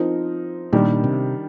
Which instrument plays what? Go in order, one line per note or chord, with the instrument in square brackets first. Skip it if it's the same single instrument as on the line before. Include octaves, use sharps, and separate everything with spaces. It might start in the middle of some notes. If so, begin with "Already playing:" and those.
Already playing: [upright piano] F3 C4 D#4 A#4
[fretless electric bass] A#2 [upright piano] D#3 G3 D4 G4 A#4
[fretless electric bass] C3